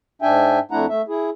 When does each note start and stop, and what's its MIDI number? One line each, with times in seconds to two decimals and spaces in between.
0.22 0.59 44
0.22 0.59 62
0.22 0.59 76
0.22 0.59 79
0.22 0.59 80
0.71 0.86 41
0.71 0.86 57
0.71 0.86 62
0.71 0.86 64
0.71 0.86 78
0.71 0.86 82
0.89 1.02 57
0.89 1.02 76
1.08 1.30 64
1.08 1.30 68